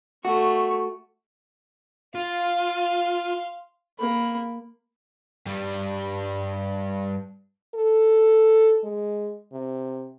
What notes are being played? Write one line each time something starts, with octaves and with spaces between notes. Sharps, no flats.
A3 F#4 C#6
F4 F5 C6
A#3 B5
G2 G3
A4
G#3
C3